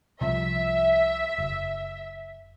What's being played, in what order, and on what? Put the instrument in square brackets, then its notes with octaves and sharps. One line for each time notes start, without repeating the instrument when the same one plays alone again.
[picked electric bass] C2 C3 F3 [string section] E5
[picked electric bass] F#1